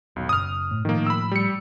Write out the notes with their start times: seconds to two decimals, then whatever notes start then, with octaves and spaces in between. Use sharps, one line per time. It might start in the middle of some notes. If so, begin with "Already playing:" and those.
0.16 D#1 B1
0.29 F#1 D#6 F6
0.71 A2
0.85 A2 D#3 F3 A#3
1.07 B5 E6
1.31 G3 C#7